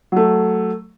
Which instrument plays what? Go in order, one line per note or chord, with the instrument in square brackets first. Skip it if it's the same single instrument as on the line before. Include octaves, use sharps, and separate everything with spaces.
[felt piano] F#3 A3